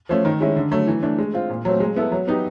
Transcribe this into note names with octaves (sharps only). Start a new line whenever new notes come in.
F3 A3 C#4
D#3
G#3 C#4 E4
D3
F#3 A3
E3
A3 D4
G#3
C4 F4
A#2
F#3 A3 C4
G#3
B3 E4 A4
F#3
B3 D#4 G4